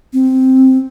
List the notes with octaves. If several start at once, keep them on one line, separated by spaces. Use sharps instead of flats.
C4